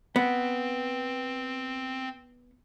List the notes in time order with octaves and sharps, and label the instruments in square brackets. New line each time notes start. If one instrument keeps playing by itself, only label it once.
[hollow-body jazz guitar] B3 [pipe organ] C4